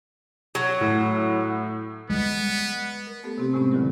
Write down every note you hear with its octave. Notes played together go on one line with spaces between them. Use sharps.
F#3
A2
G3 G#3 B3
A#4
A3 B3 G4 A4
C3 C4 G4
A2 C3 G#3 A3 B3 C#4
D3 D#3 F#3 E4 G4 A#4